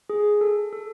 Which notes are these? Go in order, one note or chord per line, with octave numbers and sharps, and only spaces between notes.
G#4
A4
A4